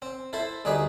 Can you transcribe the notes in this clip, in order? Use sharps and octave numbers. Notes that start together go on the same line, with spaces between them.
C4
E4 A4 C5
D2 G3 D#4 G#4 B4